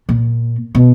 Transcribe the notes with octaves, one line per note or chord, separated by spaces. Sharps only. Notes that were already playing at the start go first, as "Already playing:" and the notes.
A#2
B2